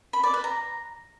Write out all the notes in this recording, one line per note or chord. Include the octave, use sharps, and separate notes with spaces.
B5
D5
B4
A#5